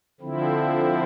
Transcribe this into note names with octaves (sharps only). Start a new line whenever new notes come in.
D3 F3 C4 E4